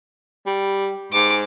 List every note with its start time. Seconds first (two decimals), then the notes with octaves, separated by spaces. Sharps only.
0.46 G3
1.12 G#2 D6